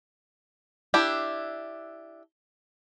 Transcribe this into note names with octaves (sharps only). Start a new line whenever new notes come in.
D4 E4 G4